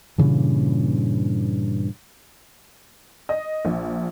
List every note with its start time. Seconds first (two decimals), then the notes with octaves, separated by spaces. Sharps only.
0.18 G2 A#2 C#3 E3
3.29 D#5
3.65 A#1